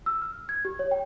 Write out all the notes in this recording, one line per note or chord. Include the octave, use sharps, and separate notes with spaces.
E6
F6
G#6
G4
C#5
G5